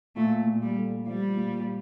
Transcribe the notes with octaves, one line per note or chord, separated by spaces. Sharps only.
A#2 A3
A#2
G3
A3
F3 G3
A#2